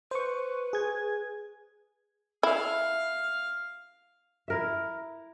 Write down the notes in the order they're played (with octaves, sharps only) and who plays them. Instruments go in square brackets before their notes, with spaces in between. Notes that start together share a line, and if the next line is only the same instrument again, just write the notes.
[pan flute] B4 [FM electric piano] C5 C#6
[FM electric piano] G#4 G#6
[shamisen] E4 [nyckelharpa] F5
[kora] E4 A#4 E5